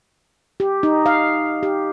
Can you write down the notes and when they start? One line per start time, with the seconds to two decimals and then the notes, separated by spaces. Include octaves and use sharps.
0.60 G4
0.83 D#4
1.06 F5
1.63 G4